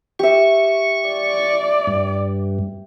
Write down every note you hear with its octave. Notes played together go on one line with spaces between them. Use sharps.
G4 E5 C#6
D5
G2